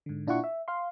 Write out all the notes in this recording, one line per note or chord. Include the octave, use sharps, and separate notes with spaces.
G#2 D3
A#2 D4 E4 F4 F#5 C#6
E5
F5 C6